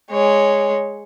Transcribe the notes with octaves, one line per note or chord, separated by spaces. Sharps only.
G#3 C#5